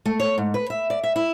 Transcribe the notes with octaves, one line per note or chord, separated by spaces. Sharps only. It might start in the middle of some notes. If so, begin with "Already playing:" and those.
A3
C#5
G#2
B4
E5
D5
E5
E4